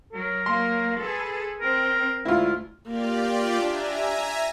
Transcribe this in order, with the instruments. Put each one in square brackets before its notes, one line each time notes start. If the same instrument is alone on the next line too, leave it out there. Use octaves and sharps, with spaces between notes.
[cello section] F#3 [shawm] A#4
[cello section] F#3 A#3 [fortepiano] C6
[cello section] G#4 A4 B4
[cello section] C4 [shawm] A#4
[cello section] D2 G#2 [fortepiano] E4 F4
[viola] A#3 [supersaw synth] F4 G4 D5
[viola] D4 [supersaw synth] E5 G#5 A#5